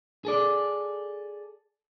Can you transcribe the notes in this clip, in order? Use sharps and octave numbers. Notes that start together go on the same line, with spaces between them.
G#4 A4 D5